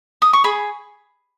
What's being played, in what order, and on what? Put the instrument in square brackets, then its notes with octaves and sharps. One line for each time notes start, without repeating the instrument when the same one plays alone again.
[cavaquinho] D#6
C#6
G#4 B5